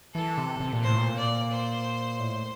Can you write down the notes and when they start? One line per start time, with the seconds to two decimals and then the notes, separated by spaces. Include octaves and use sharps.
0.14 E3 A4
0.38 C3
0.60 C3
0.73 A#2
0.83 A2 C5
0.97 A#2
1.17 D5
1.51 C5
2.19 A2